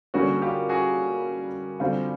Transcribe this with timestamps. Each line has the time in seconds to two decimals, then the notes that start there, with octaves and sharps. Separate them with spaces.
0.14 D3 G3 A#3 C#4 F#4 G#4
0.42 F4 G4
0.69 F#4 G#4
1.80 D3 G3 C4 F4